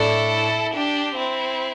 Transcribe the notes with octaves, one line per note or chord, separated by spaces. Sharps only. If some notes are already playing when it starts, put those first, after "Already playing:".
Already playing: A2 A3 D4 E4 A4
D4 G4
C4 E4